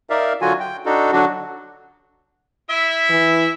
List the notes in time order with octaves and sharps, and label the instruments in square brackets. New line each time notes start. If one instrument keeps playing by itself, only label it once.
[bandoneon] D#4 A#4 D5 E5 F5
D3 F#3 F4 F#4 G#5
G5
D4 D#4 F#4 A4
D3 F#3 D4 F#4
[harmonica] E4 E5
[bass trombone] E3